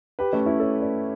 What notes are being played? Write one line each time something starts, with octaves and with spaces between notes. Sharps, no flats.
G4 B4
A3 C#4
C#4 E4
A4 C#5
B4 D5